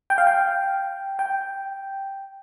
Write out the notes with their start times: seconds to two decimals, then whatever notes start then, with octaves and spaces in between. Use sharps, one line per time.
0.10 G5
0.18 F5
0.27 G5
1.19 G5